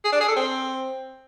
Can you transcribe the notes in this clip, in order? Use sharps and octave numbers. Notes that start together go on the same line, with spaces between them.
G#4
D4
G#4
A4
C4